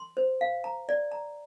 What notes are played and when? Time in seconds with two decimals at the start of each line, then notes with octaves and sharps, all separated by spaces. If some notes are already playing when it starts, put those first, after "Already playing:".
Already playing: C6
0.17 C5
0.41 F5
0.64 A#5
0.89 D5
1.12 A#5